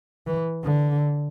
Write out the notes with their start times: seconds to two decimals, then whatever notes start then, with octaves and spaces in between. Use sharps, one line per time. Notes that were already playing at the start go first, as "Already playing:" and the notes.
0.27 E3
0.64 D3